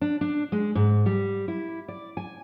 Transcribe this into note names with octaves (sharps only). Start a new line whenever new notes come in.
D4
D4
G#3
G#2
G3
E4
D5
G#5